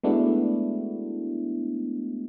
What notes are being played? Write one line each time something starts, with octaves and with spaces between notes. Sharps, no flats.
G#3 A3 B3 D4 E4 F#4